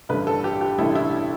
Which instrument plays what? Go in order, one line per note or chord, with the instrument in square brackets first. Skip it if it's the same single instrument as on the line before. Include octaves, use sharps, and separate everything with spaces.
[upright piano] A1 G2 D3 A3 B4
A4
G4
G4
A1 G2 D3 A3 E4
E4